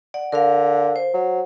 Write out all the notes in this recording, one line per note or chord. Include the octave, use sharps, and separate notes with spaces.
D5 F#5
D3 A#4 F5
C5
F#3